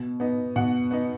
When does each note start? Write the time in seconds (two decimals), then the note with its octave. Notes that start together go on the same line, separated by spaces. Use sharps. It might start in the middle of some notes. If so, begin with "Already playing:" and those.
Already playing: B2
0.20 B3 D#4
0.56 B2 F#5
0.91 B3 D#4